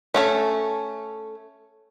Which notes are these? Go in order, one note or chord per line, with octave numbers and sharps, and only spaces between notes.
A3 C#4 A4